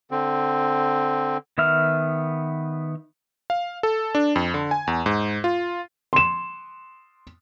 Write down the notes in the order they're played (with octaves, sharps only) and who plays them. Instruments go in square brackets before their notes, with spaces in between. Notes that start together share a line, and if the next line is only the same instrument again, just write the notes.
[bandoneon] D3 C4
[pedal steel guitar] D#3 B3 E5 F6
[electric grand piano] F5
A4
D4
F2
D3
G#5
E2
G#2
F4
[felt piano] C6 E7